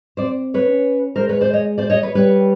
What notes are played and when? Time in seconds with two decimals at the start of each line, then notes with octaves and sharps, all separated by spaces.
0.17 C4 C5 D5
0.54 B4 C#5
0.66 C#4
1.16 G#3 A#4 C5
1.29 B4 C#5
1.41 C5 D5
1.53 C#5 D#5
1.78 C5 D5
1.90 C#5 D#5
2.03 B4 C#5
2.15 G3 B4 C#5